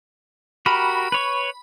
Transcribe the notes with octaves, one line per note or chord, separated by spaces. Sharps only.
F#4 G4 A#4 B5
B4 C#5 C#6